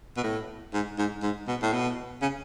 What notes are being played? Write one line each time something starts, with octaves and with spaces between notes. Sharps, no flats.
B2
A2
G#2
G#2
G#2
B2
A2
B2
C#3